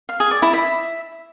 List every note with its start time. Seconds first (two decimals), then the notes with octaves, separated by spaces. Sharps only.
0.09 F5
0.20 G#4
0.31 D5
0.42 E4
0.53 E5